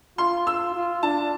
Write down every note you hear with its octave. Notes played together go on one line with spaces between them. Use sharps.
F4 C6
E6
F4
D4 A5